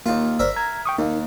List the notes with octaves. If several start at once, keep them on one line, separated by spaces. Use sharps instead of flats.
D#2 A#3 F4
G1 A#4 C5 D5 E5
A#5 G#6
G5 C#6 D#6
D#2 A#3 D#4